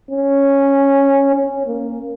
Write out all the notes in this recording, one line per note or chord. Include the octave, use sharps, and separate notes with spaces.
C#4
C#4
A#3